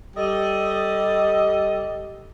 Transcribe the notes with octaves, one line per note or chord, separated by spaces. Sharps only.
G3 A4 D#5